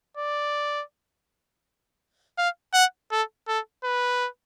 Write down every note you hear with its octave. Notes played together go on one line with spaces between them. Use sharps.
D5
F5
F#5
A4
A4
B4